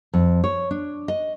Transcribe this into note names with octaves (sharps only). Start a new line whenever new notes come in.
F2
C#5
D4
D#5